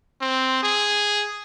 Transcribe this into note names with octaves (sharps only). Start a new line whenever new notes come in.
C4
G#4